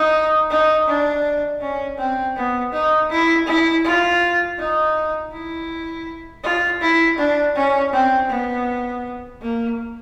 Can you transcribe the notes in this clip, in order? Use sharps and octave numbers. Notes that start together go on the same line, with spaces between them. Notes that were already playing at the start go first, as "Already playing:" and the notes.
Already playing: D#4
D#4
D4
C#4
C4
B3
D#4
E4
E4
F4
D#4
E4
F4
E4
D4
C#4
C4
B3
A#3